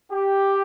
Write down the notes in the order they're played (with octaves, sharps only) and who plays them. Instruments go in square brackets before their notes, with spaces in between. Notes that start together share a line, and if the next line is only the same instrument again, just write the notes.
[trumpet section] G4